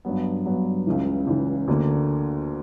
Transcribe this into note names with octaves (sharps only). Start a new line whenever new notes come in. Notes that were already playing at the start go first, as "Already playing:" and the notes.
G2 F#3 B3
G2 F#3 B3
C#2 C#3 E3
C#2 C#3 E3
D2 D3 A#3